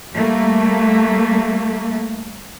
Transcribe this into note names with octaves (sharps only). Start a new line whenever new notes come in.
G3 A3 A#3